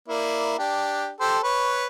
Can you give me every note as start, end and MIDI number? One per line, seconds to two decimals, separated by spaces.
0.08 0.55 58
0.08 0.55 64
0.08 0.55 74
0.59 1.10 62
0.59 1.10 67
1.20 1.38 67
1.20 1.38 69
1.20 1.38 72
1.43 1.87 71
1.43 1.87 73